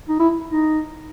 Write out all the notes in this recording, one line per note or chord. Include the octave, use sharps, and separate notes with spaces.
D#4
E4
D#4